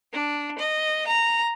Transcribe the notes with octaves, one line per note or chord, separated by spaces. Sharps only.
D4
D#5
A#5